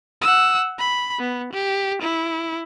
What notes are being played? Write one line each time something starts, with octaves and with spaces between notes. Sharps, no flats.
F#5 E6
B5
B3
G4
E4